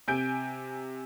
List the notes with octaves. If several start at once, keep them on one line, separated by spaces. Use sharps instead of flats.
C3 G#5 G6 D7